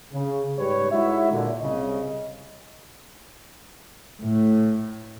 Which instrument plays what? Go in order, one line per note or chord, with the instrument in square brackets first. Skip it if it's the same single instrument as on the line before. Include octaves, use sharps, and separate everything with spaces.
[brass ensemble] C#3
G#2 G3 G4 B4 C#5
G#3 D#4 E4 F#4 C#5 E5
A#2 D3
C2 C#3 D#5
[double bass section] A2